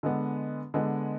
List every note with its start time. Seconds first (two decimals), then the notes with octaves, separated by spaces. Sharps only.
0.03 D3 G#3 B3
0.74 D3 G#3 B3